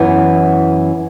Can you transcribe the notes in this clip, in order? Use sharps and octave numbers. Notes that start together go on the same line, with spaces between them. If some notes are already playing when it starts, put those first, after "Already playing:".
Already playing: F#2 E3 B3